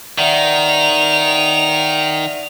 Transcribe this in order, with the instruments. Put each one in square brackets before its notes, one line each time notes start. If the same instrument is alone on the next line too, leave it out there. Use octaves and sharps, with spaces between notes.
[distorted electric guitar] D#3 [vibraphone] D5 E5 F#5 [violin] F7